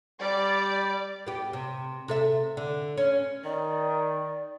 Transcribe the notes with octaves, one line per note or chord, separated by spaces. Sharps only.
G3 D5
B3 G4
C3
C3 A4 E5
D3
C#4
D#3 D5